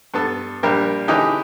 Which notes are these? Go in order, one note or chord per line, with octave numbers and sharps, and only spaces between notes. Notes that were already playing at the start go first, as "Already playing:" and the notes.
G2 B3 A4
A#1 G3 G4 A#4
D3 E3 C#4 D#4 G4 G#4